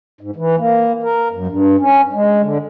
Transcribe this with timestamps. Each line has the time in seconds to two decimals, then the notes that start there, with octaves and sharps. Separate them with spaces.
0.21 G#2
0.36 E3
0.58 A#3
1.03 A#4
1.31 F#2
1.47 G2
1.80 C#4
2.13 G#3
2.42 D3